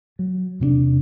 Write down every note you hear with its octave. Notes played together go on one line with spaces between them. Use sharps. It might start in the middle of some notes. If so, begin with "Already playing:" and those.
F#3
E2 C3 C4 D4